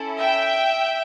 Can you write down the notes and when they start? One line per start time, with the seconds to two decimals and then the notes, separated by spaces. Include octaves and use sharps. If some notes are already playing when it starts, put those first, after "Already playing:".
Already playing: C#4 E4 A4
0.19 E5 G5